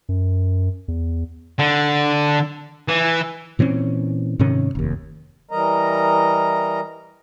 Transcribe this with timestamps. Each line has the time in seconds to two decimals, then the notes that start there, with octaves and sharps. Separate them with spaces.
0.09 F#2
0.88 E2
1.59 D3
2.88 E3
3.59 A#2 E3 C4 C#4
4.39 G#2 C3 D#3 C#4
4.75 F1 D#2
5.51 E3 G3 A#4 D#5 A#5